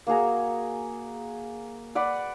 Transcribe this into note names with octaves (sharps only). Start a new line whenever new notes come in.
A#3 F#4 G#4 A#5
B4 D5 F#5